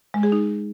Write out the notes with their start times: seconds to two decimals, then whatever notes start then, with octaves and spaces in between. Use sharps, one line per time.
0.14 G#3
0.23 G#4
0.32 D#4